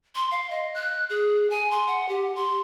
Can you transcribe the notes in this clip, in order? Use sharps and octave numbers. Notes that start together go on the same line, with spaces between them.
C6
F5
D#5
F#6
G#4
G#5
C6
F#5
G4
C6